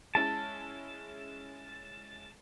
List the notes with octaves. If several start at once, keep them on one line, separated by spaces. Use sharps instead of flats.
G#3 C#4 E4 A5